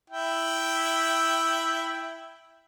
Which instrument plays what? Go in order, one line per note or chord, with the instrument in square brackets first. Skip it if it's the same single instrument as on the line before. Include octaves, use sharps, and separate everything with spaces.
[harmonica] E4 G5